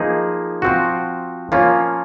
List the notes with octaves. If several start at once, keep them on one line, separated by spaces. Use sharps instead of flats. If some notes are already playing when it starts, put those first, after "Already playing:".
Already playing: F3 A#3 D#4 G#4
F3 C4 F#4
F3 A#3 C#4 F4